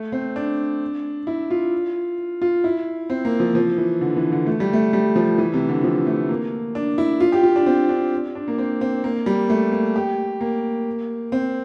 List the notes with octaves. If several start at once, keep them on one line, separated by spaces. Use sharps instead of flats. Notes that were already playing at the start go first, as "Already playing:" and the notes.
Already playing: A3
C4
D4
E4
F4
F4
E4
C4
A#3
F3
F3
E3
D3
E3
D3
A3
G3
A3
G3
F3
E3
C3
D3
F3
A3
A#3
D4
E4
F4
G4
F4
D4
C4
D4
D4
A#3
C4
C4
A#3
G3
A3
A#3
G4
A#3
C4